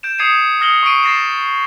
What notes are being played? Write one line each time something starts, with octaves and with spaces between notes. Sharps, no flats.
G6 D7 E7
D#6 G#6 C7 C#7 D#7 E7
D#6 F6 A#6 C#7 F#7 G7
C#6 D#6 C7 D7 D#7
A6 A#6 C7 E7